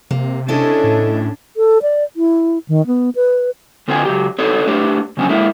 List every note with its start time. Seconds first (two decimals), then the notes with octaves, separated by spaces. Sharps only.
0.11 C3 A#3
0.48 C#3 C#4 D4 E4 A4 D#5
0.84 A2
1.57 A4
1.82 D5
2.16 E4
2.68 D#3
2.87 B3
3.16 B4
3.88 D3 C4 F4 B4 E5 G#5
4.05 C#3 F#3 G4
4.39 C4 D#4 A4 B4 C#5
4.67 A3 D4 G4 B4
5.17 C#3 F#3 C4 C#4 G#5
5.29 G#3 A#3 E4